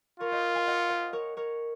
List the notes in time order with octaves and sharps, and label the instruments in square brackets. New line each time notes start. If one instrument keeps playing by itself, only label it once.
[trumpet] F4 [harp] A#4 C#5
[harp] C5 D#5
F5 G#5
D#5 F#5
C5 D#5
A#4 C#5
A#4 C#5